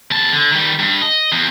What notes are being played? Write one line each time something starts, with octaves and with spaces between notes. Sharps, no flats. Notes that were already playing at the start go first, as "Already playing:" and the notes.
E2 A5
D3
D#3 G3
G2
D#5
E2